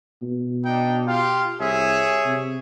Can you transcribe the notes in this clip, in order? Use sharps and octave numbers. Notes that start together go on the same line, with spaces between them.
B2
D4 D#4 G5
F4 G4 F5
C2 G#4 C#5 E5
C3